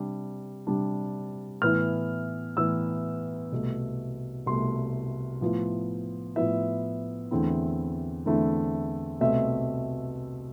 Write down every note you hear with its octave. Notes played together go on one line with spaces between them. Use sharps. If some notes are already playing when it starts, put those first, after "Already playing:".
Already playing: C3 G3 D4
C3 G3 D4
A2 E3 B3 E4 F6
A2 E3 B3 E4 E6
C2 B2 A3
C2 B2 A3 C6
A2 F3 B3 E4
A2 F3 B3 E4 E5
E2 D3 A3 C4 E4
E2 D3 A3 C4 E4
C2 B2 A3 C4 E5